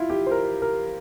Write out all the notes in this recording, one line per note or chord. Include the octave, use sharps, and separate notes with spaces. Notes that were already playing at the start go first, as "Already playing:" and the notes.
Already playing: E4 F4
G4
C5
A#4
A#4